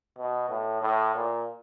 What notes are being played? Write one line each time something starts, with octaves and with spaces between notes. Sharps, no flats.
B2
A2
A2
A#2